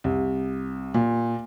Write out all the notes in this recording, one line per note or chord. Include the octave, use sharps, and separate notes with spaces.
C2
A#2